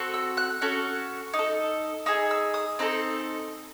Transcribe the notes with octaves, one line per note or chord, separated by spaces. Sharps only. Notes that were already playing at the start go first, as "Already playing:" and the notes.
Already playing: C4 F#4 A4
E6
F#6
C#4 F#4 A4
D#4
A4
D#4 G#4 E6
E6
D#6
C4 D#4 A4